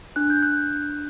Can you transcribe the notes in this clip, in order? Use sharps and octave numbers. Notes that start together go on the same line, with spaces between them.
D4 F#6
G6
F#6